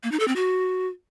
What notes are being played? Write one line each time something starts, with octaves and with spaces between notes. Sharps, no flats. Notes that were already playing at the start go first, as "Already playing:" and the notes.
A#3
D#4
A4
C4
F#4